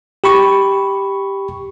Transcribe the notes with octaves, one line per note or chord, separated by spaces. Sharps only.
G4 B5 C#6